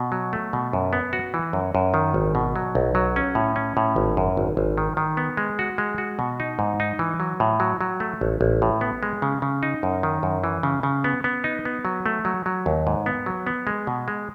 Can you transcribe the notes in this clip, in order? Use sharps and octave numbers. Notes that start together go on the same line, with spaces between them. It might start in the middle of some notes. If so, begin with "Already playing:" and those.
Already playing: B2
F#3
A3
B2
F#2
B3
F#4
E3
F#2
F#2
D#3
G#1
B2
F#3
B1
F#3
C#4
A2
C#4
A2
G#1
F#2
G#1
G#1
D#3
D#3
B3
G#3
F#4
G#3
F#4
B2
D#4
G#2
D#4
E3
F#3
A2
F#3
F#3
A3
A1
A1
A2
B3
G#3
C#3
C#3
D#4
F#2
D#3
F#2
E3
C#3
C#3
B3
B3
D#4
B3
F#3
A3
F#3
F#3
D#2
G#2
B3
F#3
B3
G#3
B2
G#3